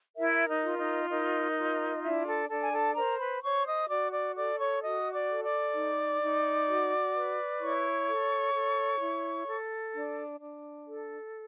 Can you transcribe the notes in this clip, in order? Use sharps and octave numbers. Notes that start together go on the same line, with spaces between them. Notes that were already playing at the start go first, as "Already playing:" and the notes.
E4 A#4 E5
D#4 D#5
F4
D#4 D#5
D#4 A#4 D#5
F4
D4 E4 E5
A4 A5
D4 A4 A5
G#5
A4 A5
A#4 C5 A#5
B4 B5
C5 C#5 C#6
D#5 D#6
F#4 D5 D6
D5 D6
A4 D5 D6
C#5 C#6
F#4 D#5 D#6
D5 D6
A4
D5 D6
D#4
D#4
F#4
B4
E4 C#5 C#6
A4
A4
E4
A4
D4
D4
A4